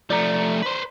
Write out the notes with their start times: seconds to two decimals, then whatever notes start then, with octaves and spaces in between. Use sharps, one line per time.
0.10 F3 A3 D5 A#5
0.62 B4 C5